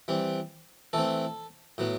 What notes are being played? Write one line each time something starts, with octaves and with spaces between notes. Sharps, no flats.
E3 G3 C4
E3 A3 C4 A4
A2 F#3 B3